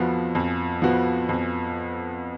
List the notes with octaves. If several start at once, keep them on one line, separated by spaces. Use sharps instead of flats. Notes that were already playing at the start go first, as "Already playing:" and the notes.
Already playing: F2 F3 B3 F#4
F2
F3 B3 F#4
F2